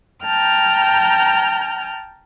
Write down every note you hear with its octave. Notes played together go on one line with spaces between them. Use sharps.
G5 A5 A#5 F6 G6